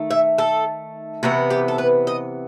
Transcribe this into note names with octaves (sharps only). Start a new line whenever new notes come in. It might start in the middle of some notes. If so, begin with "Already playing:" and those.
Already playing: D#3 A3
E5
A4
C3 E3 B3 F#4
G4
A4
B4
D#5